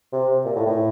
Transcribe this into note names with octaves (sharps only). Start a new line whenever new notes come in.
C3
A#2
A2
A2